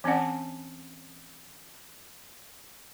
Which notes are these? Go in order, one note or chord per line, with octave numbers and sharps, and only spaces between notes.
E3 C4 C#4 D5 F#5